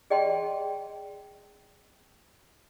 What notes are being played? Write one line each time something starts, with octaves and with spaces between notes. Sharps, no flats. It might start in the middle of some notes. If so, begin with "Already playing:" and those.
G#4 D5 D#5 G5 A5 C6